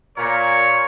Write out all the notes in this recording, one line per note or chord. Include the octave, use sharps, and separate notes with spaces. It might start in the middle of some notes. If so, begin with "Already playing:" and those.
A#2 A#4 C#5